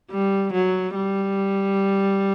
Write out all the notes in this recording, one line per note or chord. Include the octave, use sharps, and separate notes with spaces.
G3
F#3
G3